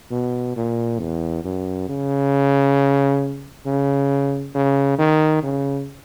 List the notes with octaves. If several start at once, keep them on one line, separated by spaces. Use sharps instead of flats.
B2
A#2
E2
F#2
C#3
C#3
C#3
D#3
C#3